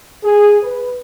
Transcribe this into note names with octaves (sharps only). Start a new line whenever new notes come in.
G#4
B4